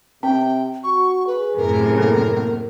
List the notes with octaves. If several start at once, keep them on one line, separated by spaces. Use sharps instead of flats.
C3 C4 G5
F#4 C#6
G#4 B4
F#2 A2 C3 A#4
A#3 A4
A#3